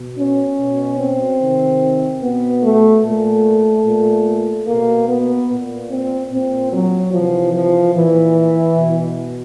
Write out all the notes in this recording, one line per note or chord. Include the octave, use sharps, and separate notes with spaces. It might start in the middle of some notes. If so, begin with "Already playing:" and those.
Already playing: B2
C#4
B2
C4
C3 D#3
B2 B3
A3
A#2 A3
A#2
B2 A#3
B3
A#2
C4
A#2 C4
F#3
C3 E3 F3
F3
A#2 E3
B2